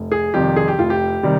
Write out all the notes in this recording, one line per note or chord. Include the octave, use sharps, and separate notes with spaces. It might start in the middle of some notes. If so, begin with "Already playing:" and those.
Already playing: F1
G#4
F2 C3 D#3 G3 G4
G#4
G4
F1 F4
G4
C3 D#3 G3